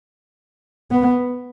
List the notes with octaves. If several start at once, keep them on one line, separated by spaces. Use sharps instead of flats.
B3